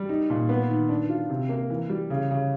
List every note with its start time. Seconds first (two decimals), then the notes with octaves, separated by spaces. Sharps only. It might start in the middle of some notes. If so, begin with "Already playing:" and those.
Already playing: G3
0.09 D#4
0.30 A#2
0.49 B3
0.69 D#3
0.89 D4
1.09 F4
1.30 C3
1.49 A#3
1.70 E3
1.89 G3
2.10 C#3
2.31 C#3